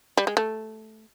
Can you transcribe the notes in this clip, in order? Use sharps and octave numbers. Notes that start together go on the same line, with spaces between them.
G3
G#3
A3